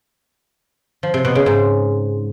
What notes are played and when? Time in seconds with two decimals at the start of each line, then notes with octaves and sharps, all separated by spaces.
1.03 F3
1.14 C3
1.25 B2
1.35 C#3
1.46 G#2